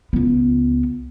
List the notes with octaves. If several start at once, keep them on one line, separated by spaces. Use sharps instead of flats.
C#2 B3